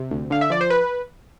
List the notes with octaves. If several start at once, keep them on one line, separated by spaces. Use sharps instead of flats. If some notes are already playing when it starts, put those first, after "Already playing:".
Already playing: C3
D2
D3 F5
E5
F3 D5
C5
B4